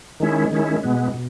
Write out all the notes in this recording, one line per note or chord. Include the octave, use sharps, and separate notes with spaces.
D#3 G#3 C#4 E4
D#3 G#3 C#4 E4
B2 G#3 B3
B2